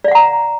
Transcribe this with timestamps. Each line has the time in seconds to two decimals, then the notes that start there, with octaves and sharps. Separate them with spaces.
0.04 D5
0.08 F5
0.12 F#5
0.15 A#5